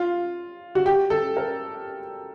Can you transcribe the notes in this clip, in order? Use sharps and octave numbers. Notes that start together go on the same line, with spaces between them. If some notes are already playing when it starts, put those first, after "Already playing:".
Already playing: F4
F#4
G4
A4
A#4